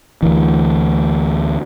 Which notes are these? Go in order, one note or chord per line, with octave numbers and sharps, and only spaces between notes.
D2 E3